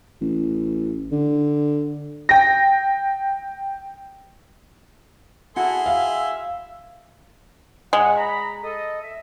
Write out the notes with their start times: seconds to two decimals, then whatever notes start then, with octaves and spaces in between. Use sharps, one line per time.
0.21 A1
1.11 D3
2.29 G5 A#6
5.56 E4 F#4 G#4 A4 C6
5.86 E5 F5
7.93 A#2 G#3 F#5
8.16 A#5 B5
8.63 A4 D#5
9.02 E5